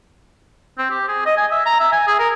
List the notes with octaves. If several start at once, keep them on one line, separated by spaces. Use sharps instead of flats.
C4
G4
G#4
D#5
G#5
E5
A#5
E5
G#5
G#4
A#4